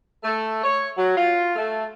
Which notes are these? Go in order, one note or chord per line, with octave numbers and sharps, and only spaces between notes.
A3
C#5
F#3
F4
A3